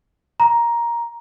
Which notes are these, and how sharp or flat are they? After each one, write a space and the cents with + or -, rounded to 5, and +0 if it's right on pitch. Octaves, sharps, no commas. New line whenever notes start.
A#5 +10